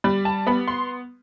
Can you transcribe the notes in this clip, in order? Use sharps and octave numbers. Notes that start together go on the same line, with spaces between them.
G3 B5
A5
B3 B5
C6